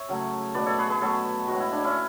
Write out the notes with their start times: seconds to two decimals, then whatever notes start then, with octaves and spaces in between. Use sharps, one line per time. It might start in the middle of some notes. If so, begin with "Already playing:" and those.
Already playing: C#5 E5
0.09 C#3 F#3 A3
0.54 B2 A3 B4 D5
0.66 A4 C#5
0.78 G#4 B4
0.90 G#4 B4
1.01 B2 F#3 A3 A4 C#5
1.47 A2 G#3 F#4
1.60 E4
1.72 D4
1.84 C#4 E4